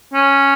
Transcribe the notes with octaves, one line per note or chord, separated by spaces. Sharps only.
C#4